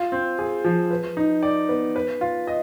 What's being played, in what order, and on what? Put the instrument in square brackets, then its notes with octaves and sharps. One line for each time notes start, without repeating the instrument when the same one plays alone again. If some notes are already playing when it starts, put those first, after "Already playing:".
Already playing: [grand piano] F4
C4
G#4
F3
B4
D#4
D5
B3
B4
F4
D#5